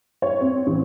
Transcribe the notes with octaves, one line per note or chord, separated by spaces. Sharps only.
C#5
C4
A1